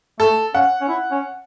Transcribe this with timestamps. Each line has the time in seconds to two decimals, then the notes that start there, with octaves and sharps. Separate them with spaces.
0.19 A3 A4
0.54 C#4 F#5
0.81 C#4
0.88 E4
1.11 C#4